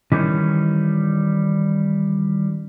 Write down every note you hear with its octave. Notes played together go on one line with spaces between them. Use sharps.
D#3 E3 G3 C#4 D#4